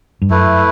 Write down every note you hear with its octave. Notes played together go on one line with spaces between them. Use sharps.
G2
F#2 A3 E4 B4